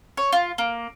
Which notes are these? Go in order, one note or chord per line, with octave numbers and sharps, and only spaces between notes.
C#5
F4
A#3